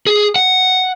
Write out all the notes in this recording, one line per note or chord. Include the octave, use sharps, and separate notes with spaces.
G#4
F#5